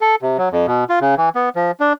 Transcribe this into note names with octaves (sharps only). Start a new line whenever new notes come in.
A4
C3
F#3
F2
B2
F4
C#3
E3
B3
F3
D4